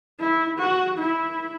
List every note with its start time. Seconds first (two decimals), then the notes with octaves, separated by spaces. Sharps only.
0.20 E4
0.59 F#4
0.98 E4